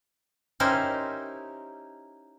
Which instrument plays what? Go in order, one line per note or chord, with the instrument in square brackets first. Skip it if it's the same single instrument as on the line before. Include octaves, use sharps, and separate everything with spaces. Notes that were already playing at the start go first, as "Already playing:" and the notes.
[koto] C#4 D#4 E4 G4 A#4 C5